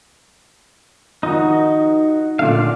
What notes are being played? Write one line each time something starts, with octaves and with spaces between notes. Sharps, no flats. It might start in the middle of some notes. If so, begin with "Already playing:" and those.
D#3 F3 D#4 F#4 D#6
A#2 D3 A3 D5 F5